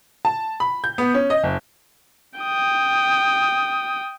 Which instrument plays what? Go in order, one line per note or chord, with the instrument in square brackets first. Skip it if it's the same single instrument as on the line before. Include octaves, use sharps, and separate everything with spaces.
[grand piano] A5
B5
G6
B3
C#4
D#5
F#1
[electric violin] G5 D#6